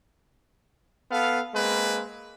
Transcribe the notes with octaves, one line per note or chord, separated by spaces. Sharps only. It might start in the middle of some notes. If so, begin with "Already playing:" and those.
B3 A4 F5
G#3 A#3 C4 B4